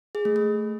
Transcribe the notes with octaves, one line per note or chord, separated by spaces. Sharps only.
G#4
A3
A3